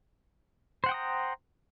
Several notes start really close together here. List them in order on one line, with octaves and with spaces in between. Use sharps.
C5 F#5 G5 D#6 A#5